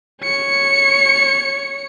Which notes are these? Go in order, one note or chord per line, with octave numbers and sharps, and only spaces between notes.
C#5 C#7